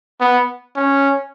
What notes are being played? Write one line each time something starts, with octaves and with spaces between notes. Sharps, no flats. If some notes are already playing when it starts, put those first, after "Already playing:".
B3
C#4